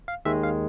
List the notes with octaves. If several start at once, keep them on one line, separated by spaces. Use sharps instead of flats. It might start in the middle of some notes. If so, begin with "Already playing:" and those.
F5
D#2 D#3 G#3 E5
F5